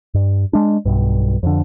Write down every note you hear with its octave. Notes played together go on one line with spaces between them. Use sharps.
G2
G#3 D4
B1 G2
F2 D3